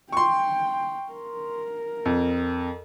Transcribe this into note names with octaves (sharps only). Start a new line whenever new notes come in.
G5 C6 C#6
A#4
F2